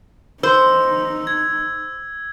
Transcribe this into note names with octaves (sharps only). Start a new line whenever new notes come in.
D#4 C5 E6
G#6